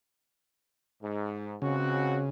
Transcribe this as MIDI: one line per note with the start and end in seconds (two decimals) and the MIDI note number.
1.02 1.55 44
1.62 2.23 37
1.62 2.30 49
1.62 2.23 60
1.62 2.23 66